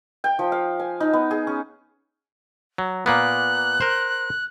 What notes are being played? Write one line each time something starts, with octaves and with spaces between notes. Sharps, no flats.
G5
F3
F5
G#5
D#4
B3
G#4
C#4
F#3
A#2 A#3 B3 F#6
A#4 C5